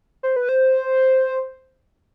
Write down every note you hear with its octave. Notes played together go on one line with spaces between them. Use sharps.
C5
B4
C5